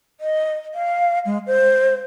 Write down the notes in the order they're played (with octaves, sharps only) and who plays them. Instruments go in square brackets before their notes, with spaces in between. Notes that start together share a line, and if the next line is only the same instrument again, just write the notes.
[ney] D#5
F5
G#3
C5